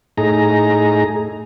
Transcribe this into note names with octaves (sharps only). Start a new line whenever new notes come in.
A2 D#4 G#4 A#5